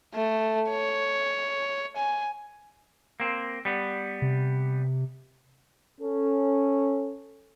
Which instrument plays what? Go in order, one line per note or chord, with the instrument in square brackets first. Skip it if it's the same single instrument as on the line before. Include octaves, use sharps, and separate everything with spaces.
[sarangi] A3
C#5
G#5
[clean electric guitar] A#3 C4
G3 B3
[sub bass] C3
[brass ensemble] C#4 A4